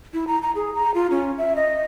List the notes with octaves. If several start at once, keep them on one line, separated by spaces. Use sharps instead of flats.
E4
A#5
A#5
G#4
A#5
F4
C#4
E5
D#5